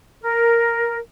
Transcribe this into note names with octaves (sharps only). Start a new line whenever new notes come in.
A#4